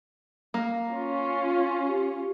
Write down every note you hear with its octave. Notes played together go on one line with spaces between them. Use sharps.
A#3
C#4 F4
G4